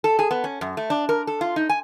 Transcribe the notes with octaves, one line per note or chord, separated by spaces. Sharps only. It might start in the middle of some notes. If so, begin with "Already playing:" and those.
A4
G#4
B3
C#4
F#2
A3
D4
A#4
A4
F4
D#4
G#5